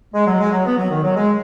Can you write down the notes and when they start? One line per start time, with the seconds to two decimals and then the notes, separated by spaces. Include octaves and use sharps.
0.13 G#3
0.26 F#3
0.39 G#3
0.51 F#3
0.65 B3
0.77 F#3
0.90 D#3
1.03 F#3
1.16 G#3